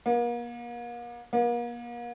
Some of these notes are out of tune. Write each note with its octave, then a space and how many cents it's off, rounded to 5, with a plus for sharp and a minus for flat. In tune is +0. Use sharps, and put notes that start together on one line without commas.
A#3 +40
A#3 +40